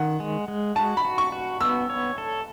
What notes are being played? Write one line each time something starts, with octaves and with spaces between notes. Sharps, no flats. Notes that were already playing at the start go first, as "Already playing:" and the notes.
Already playing: D#3 F#5
G#3
G#3
F#4 A5
B5
F#4
C#6
F#4
B3 E6
C#5
A4